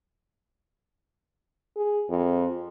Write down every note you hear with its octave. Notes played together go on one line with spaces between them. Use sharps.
G#4
F2